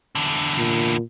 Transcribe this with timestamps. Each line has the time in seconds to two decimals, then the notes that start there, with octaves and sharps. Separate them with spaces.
0.15 E2 D3
0.58 A#2